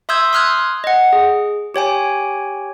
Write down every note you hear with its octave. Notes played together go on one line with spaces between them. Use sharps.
E5 C6 D#6 E6 G6 G#6
C6 D#6 F6 F#6 G#6
D#5 F#5
G#4
G4 C#5 G5 G#5